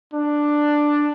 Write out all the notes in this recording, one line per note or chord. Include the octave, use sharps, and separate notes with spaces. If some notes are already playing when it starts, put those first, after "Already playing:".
D4